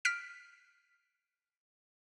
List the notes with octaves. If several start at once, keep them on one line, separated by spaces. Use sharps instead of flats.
F6 B6 D7